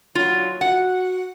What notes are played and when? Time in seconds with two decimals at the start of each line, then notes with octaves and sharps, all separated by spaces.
0.15 A#2 D#3 F#3 F4
0.61 F#4 F#5